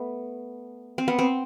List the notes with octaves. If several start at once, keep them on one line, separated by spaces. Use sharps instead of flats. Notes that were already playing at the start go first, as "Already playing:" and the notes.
Already playing: A3 B3
C4
B3
C4